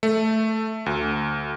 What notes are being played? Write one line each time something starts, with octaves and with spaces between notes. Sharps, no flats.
A3
D2